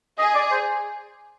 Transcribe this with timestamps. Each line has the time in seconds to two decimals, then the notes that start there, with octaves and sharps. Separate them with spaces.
0.18 G#4 D#5
0.35 D5
0.51 C5